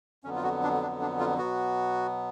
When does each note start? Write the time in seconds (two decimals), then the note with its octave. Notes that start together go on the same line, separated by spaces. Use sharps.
0.24 F2 D3 F#3 B3 C#4
0.36 F4
0.43 F#4
0.63 D4
0.82 D4
1.01 D4
1.20 F4
1.38 B2 F#3 B3 F#4